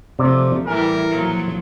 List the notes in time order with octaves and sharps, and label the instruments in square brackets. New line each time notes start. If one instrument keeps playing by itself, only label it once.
[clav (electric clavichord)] C3 D5 [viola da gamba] F3 A3
[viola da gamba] A2 E3 G3 [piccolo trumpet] A#4 [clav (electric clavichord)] G#5
[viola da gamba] A#2 F3 F#3